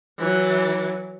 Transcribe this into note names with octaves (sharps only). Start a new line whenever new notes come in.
E3 F#3